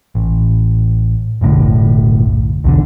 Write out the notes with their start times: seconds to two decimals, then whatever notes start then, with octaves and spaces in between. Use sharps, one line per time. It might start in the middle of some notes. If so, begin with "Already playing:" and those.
0.15 A1
1.41 F#1 B1 A2 D3
2.64 B1 E2 D3